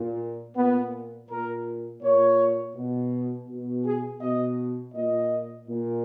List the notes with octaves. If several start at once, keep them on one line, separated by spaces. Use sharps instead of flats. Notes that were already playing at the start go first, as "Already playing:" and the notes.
Already playing: A#2
A#2 B3
A#2 A#4
A#2 C#5
B2
B2
G#4
B2 D#5
A#2 D#5
A#2